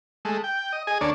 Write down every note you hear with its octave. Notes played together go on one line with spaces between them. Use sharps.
G#3 A3
G5
D#5
G#4 D#5 G#5
D2 A#3 D4 C#5 D5